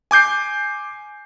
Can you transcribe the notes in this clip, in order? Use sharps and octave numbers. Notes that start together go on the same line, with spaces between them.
G#5 D6 G6 C7